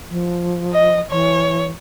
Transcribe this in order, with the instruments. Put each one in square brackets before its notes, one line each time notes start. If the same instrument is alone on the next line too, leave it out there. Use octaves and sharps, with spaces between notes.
[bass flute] F3
[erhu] D#5
[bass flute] E3 [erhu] C#5